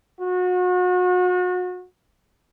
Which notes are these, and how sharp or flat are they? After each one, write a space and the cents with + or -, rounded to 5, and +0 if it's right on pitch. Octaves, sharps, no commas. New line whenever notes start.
F#4 -35